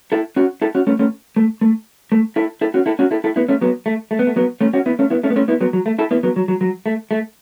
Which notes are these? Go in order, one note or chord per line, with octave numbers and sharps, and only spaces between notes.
E4 A4
C#4 F#4
E4 A4
C#4 F#4
A3 C#4
A3 C#4
A3
A3
A3
E4 A4
E4 A4
C#4 F#4
E4 A4
C#4 F#4
E4 A4
E4 A4
B3 E4
A3 C#4
F#3 B3
A3
A3
B3
A3
F#3 B3
A3 C#4
C#4 F#4
B3 E4
A3 C#4
B3 E4
A3 C#4
B3
A3 C#4
B3 E4
F#3 B3
F#3
A3
E4 A4
B3 E4
F#3 B3
F#3
F#3
F#3
A3
A3